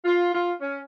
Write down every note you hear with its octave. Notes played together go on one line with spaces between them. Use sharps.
F4
F4
C#4